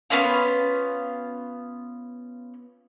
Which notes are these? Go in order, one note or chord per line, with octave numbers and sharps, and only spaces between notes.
B3 C#4 F4